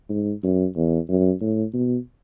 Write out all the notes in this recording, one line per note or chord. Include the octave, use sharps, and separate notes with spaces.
G#2
F#2
E2
F#2
A2
B2